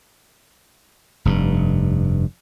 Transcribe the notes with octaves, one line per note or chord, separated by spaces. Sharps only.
F1 G2